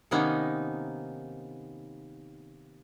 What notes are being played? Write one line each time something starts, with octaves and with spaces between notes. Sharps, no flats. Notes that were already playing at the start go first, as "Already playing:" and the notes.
C3 D#3 A#3 B3 C#4 D#4